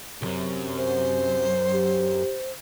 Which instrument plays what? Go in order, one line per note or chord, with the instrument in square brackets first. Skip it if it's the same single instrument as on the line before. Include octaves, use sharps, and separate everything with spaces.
[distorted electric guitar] C2 F#2 [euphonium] C3
[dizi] C5
[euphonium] G4